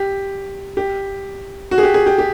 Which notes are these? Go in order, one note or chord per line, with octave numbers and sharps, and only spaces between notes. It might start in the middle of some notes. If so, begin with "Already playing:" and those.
Already playing: G4
G4
F#4
G#4
G4
G#4
G4
G4